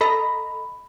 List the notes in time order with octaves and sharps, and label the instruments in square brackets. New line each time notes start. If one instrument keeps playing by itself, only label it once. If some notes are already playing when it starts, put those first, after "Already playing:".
[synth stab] A4 D#5 A#5 [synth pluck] B5